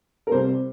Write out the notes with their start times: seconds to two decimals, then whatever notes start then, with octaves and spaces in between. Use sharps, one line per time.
0.27 A#4
0.31 C2 C3 G3 C5